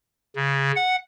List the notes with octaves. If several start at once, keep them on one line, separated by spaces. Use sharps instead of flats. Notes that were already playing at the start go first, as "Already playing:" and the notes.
C#3
F#5